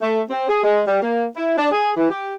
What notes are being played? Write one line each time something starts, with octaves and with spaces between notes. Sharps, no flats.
A3
C4
G#4
G#3
G3
A#3
E4
D4
G#4
E3
G4